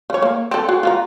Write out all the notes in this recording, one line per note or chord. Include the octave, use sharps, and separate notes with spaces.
C#3 C#5
A#3
C4 A4
F#4 G#4
F4 F#4 A#5